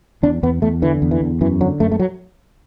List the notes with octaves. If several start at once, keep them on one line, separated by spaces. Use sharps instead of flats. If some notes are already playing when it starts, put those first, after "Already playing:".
E2 D4
E2 B3
E2 A3
D3 E3
E2
E3
E2
F#2 E3
D3 F#3
F#2 A3
A3
F#3